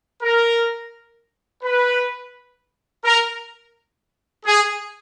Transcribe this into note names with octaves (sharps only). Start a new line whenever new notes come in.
A#4
B4
A#4
G#4